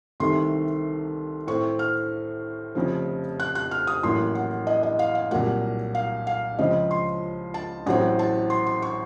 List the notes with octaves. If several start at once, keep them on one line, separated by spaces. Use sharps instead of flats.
C2 C3 D#3 A3 C6
A2 A3 C4 C#6
F6
F1 F2 C#3 F3
F#6
F#6
F6
D#6
A1 A2 F#3 A#3 C6
F#5
D#5
D#5
F5
F5
C2 A#2 F#3 A#3 F#5
F5
F5
C#2 C#3 F3 C4 D#5
C6
A5
A1 A2 F#3 C4 F#5
A5
C6
C6
C#6